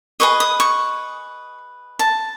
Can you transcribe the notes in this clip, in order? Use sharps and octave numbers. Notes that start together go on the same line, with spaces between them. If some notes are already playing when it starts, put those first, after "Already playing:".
G#4 B4 D#5 C#6
D#6
C#6
A5